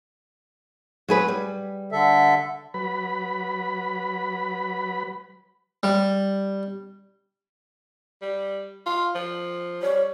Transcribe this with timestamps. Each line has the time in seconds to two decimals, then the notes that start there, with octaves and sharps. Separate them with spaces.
1.08 F#3 G#4 B4
1.28 G3
1.92 D3 A4 E5
2.74 F#3 B4 B5
5.83 G3
8.22 G3
8.86 F4
9.15 F3
9.82 G3 C#5